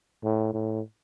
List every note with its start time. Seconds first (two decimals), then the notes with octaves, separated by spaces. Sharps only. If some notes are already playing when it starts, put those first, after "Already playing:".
0.23 A2
0.53 A2